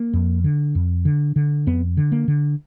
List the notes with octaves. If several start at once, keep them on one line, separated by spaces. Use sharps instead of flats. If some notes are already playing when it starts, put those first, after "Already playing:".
Already playing: A#3
F2
D3
F2
D3
D3
F2 B3
D3
A#3
D3